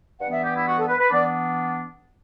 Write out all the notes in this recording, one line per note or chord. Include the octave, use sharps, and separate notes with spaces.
G2 E3 B3 F#5
E5
G4
E4
F#4
A4
B4
B4
E3 B3 D4 D5